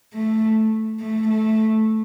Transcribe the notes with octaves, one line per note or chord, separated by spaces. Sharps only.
A3
A3
A3